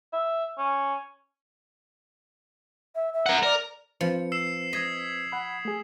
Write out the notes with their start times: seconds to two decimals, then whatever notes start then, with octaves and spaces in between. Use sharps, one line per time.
0.13 E5
0.58 C#4
2.95 E5
3.13 E5
3.26 A#4 F#5
3.43 A#4 D5
4.01 F3 C4 B4 C5 C#7
4.32 E6 C7 E7
4.73 D#5 D#6 G#6 B6
5.32 F#5 B5
5.65 A3 G#4